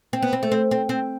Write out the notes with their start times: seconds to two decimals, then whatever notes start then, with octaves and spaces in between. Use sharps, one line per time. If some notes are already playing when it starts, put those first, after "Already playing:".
0.13 C4
0.22 B3
0.33 C4
0.43 A3
0.52 C4
0.71 C4
0.89 C4